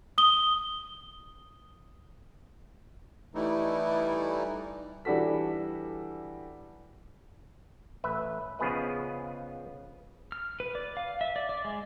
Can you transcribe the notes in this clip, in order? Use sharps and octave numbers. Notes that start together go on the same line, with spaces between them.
D#6 G7
E3 G3 A3 D#4 E4
E3 G3 D4 F#4 A4 B6
A1 B4 E5
C#3 F3 B3 G#4 B4 D#5
F6
B4
D5
F5
E5
D5
D5
G#3